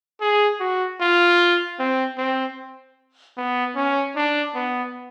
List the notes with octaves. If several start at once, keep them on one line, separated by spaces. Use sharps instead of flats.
G#4
F#4
F4
C4
C4
B3
C#4
D4
B3